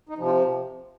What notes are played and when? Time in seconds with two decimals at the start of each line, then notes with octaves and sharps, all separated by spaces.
0.09 D#4
0.18 C3 F3
0.26 F4